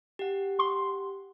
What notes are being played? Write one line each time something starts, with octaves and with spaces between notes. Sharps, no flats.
G4 F#5
C6